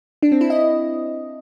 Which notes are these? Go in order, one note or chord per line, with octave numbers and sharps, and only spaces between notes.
D4
C4
E4
D#5